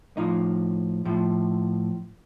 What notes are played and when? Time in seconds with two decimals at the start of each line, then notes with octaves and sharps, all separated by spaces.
0.17 A2 F3 D#4
1.05 A2 F3